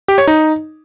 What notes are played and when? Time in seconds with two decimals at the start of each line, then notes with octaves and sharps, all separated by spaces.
0.08 G4
0.18 C#5
0.27 D#4